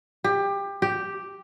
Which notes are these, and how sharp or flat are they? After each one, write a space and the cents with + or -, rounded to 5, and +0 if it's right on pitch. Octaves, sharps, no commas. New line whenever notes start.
G4 +20
G4 +0